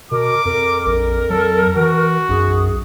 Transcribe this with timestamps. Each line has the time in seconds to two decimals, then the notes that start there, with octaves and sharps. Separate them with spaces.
0.11 B2 A#4 D6
0.45 F2 A#4
0.86 A#1 A#4
1.30 F#3 A4
1.76 E3 F#4
2.29 B1 F#2 G#4